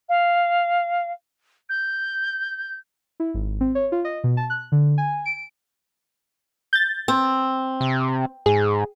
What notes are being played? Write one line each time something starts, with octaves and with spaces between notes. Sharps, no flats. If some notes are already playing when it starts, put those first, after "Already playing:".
F5
G6
E4
G#1
C4
C#5
F4
D#5
B2
A5
F#6
D3
G#5
D7
G6 A6
C4
C3
G#2 G#4